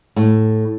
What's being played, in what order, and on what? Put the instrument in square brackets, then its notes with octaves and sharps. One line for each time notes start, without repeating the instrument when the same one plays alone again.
[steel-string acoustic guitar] A2